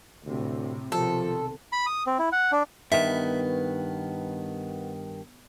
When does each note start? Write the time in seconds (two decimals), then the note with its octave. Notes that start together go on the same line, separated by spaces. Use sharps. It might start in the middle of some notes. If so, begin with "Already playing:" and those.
0.25 D2 A2 C3
0.92 B1 C3 D#3 F3 A4
1.72 B5
1.86 D#6
2.07 C4
2.19 E4
2.32 F#5
2.52 D4
2.92 G2 D#3 B3 E5